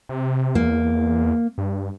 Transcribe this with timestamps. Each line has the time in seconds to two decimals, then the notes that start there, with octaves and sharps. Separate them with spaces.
0.09 C3
0.55 E2 A#3
1.58 G2